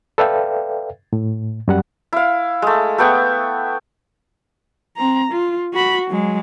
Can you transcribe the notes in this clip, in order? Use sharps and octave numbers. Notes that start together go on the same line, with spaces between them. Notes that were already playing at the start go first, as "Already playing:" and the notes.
A4 B4 D5 E5 F5 G5
A2
F#2 G3 F#5
E4 F5
G#3 A3
A3 B3 G5 C#6
C4 A#5
F4
F#4 B5
F#3 G#3